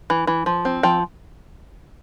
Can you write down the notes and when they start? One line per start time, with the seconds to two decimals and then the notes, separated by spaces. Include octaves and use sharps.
0.10 E3
0.27 E3
0.46 F3
0.65 C4
0.83 F3 G5